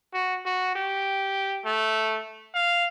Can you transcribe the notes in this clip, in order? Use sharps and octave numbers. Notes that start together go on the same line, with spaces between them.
F#4
F#4
G4
A3
F5